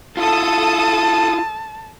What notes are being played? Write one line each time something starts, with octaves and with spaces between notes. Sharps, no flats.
E4 F4 A4 A5 D#6